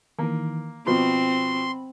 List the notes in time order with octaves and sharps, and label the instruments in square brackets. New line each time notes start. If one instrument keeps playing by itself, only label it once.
[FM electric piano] D#3 E3 [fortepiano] A#3
[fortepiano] B2 F3 [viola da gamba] C4 [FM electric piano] B5 [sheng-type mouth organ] C6